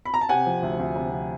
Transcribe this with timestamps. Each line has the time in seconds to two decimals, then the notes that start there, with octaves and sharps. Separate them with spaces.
0.05 B5
0.14 A#5
0.21 A5
0.29 C3 F#5 G#5
0.46 F3
0.63 D2
0.79 D2
0.96 C3
1.12 F3